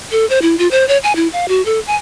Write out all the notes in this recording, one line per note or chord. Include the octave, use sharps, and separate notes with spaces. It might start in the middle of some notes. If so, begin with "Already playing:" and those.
A4
C5
E4
F4
C5
C#5
G#5
E4
F5
F#4
A4
G#5